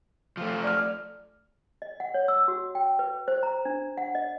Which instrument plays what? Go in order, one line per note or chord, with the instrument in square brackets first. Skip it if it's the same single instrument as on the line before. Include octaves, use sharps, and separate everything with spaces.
[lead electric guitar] F3 A3
[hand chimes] D5 F6
[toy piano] D#5
F#5
C#5
E6
F#4
G5
B4
C5
A#5
D4
F#5
D#5